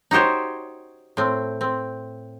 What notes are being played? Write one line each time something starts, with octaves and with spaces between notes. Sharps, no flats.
D#4 F#4 G4 C5 C#5
A2 C4
C4